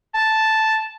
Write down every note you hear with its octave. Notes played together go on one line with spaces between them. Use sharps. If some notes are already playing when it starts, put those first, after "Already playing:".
A5